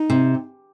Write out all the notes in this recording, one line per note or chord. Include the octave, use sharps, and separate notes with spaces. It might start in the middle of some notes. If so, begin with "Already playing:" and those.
Already playing: D#4
C3